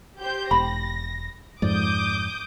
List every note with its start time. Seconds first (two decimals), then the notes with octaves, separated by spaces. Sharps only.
0.18 G4 C5 G6
0.51 E1 B5 A#6
1.62 F2 G#2 D5 D6 D#6 G6